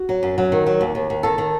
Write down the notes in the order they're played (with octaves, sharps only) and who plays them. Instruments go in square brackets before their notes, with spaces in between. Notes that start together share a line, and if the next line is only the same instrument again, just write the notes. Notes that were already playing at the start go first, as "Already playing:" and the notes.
Already playing: [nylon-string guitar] F#4
F#3
F#2
F#3
D#3
F#3
D#2
D#2
D#2
D#3 A4
D#3